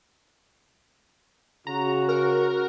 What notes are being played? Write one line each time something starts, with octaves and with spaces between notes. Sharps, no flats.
C#3 F#4 A#5
A#4